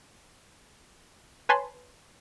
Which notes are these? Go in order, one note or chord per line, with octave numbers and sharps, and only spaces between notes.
B4 C#5 G#5 A5 B5 C6